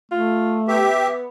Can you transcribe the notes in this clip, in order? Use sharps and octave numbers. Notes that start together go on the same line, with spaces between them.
A3 F4
B3 G4 E5